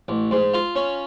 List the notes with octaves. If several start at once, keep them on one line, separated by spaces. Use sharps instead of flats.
A1
G#2
F4
C#4